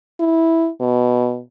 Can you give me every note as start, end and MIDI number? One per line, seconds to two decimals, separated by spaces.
0.20 0.69 64
0.80 1.40 47